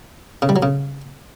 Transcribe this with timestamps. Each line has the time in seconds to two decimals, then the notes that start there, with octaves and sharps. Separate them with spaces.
0.42 C#3
0.49 G3
0.56 F#3
0.63 C#3